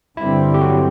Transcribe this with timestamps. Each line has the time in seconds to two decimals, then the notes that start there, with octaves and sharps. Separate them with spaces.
0.17 G2 D3 G3 C4 E4
0.54 G4
0.61 F#3 F#4